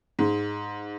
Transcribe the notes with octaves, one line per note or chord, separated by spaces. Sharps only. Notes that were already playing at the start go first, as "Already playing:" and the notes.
G#2